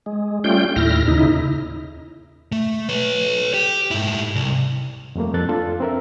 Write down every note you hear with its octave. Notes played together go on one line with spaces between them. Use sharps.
G#3
G3 A3 C#4 F4 G5 G6
D#2 A2 E4 F6 A#6
D#2 C#3 D#4 E4
A3
B4 C#5
G4
G#2 E4
C2
F2 G3 A3 A#3
F2 A4 F#6 A6
D4 F4 A4
C4 A#4 E5